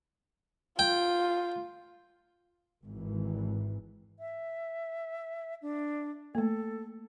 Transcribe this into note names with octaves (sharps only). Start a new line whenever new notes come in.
F4 G5
G#1 E3
E5
D4
A3 A#3 A4